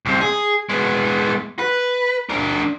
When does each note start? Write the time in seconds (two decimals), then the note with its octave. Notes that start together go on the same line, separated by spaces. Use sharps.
0.05 C2 C3
0.21 G#4
0.69 G#3 B3
1.59 B4
2.29 D4 A#4